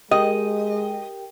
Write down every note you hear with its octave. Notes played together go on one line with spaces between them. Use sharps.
G#3 G4 A#4 D#5 G5